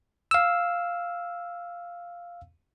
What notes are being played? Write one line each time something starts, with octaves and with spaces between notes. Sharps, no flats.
F5 E6